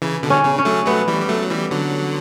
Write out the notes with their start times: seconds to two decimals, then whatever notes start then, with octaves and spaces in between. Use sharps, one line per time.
0.02 C#3 E3
0.23 B2 D3
0.30 C#4
0.44 C#3
0.58 C#4
0.65 F#3 A3
0.86 F#3 A3 B3
1.08 E3 G3
1.21 G3
1.29 F#3 A3
1.42 F#3
1.50 E3 G3
1.71 D3 F#3